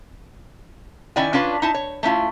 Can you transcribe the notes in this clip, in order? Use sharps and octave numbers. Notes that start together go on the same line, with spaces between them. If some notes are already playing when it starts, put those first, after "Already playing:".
D#3 C#4 E4 D5 G5 G#5
C#4 D4 F4 B4 D5
D#4 E4 A5
C#5
A3 C#4 E4 F4